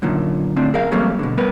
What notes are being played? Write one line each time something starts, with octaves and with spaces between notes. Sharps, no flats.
F#2 A#2 D3 D#3
A2 D3 C4 D4
G#4 A#4 F5
E2 F#3 G3 A3 A#3 C4
B2 D3
G3 B3 A#4 B4